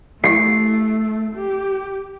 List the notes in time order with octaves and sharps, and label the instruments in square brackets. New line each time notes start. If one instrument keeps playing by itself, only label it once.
[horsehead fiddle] A3 [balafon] E4 F5 [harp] C7
[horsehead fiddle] G4